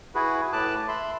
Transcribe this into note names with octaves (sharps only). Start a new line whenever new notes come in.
E4 F#4 G#4 B4
A2 B4 A5 D6 F#6
E5 B5 C6